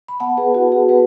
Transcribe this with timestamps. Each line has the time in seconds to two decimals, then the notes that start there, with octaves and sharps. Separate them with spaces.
0.08 B5
0.20 B3 F#5 A5
0.37 G#4 B4
0.54 E4 F#4
0.72 G#4
0.89 B3 G#4 B4